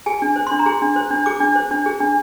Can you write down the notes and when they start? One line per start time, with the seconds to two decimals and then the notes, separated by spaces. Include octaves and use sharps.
0.06 G#4 G#5
0.22 D4
0.36 C5
0.47 D4 C6
0.59 A#5
0.66 G#4 C6
0.82 D4
0.96 C5
1.11 D4
1.26 G#4 D6
1.40 D4
1.56 C5
1.71 D4
1.86 G#4
2.01 D4